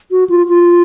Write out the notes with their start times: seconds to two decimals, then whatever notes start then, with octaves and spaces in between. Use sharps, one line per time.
0.11 F#4
0.30 F4
0.49 F4